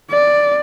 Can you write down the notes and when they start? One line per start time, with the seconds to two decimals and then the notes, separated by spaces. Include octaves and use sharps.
0.12 D5